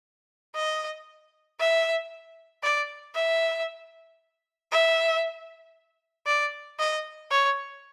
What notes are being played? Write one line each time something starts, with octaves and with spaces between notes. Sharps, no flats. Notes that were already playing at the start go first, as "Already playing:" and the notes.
D#5
E5
D5
E5
E5
D5
D#5
C#5